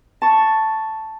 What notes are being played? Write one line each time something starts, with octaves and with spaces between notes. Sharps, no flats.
A5 C#6